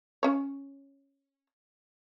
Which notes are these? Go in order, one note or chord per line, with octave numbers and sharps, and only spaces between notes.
C#4 C#5